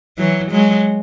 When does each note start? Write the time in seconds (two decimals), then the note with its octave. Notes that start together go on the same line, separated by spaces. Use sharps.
0.18 E3 F#3
0.51 F#3 G#3